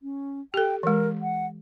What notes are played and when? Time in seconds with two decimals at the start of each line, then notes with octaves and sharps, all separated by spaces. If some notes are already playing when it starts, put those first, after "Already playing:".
0.03 C#4
0.54 G4 A4 G5
0.83 E3 G#3 A#4
1.22 F#5